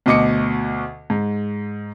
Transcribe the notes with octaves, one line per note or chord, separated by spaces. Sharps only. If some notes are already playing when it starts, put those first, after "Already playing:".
D2 B2 D#5 D6 C#7
G#2